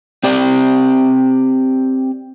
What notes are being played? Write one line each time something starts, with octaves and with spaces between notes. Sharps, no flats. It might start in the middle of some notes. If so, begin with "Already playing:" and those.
C4 G4 D5